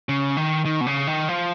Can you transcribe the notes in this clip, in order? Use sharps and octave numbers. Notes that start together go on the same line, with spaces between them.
C#3
D#3
D#3
B2
C#3
D#3
F3